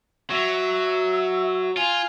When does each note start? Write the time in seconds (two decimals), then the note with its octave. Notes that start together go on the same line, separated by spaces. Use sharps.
0.31 F#3 E5
1.77 F4 G#5